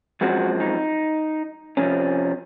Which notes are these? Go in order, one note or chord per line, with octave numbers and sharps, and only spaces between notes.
F#2 F3 G#3 C4 F#4
D#4
F2 C3 F3 C4 C#4